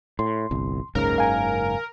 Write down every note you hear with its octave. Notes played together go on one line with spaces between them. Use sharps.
A2 C6
G1 C2
F#1 C#2 G#2 C#3 A#4 F6
F5 G#5